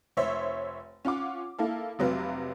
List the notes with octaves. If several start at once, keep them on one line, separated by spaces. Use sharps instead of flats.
F1 C5 C#5 E5
C#4 F4 F#5 D6
A#3 E4 A4 F5
F1 C3 F#3 C4 B4 F5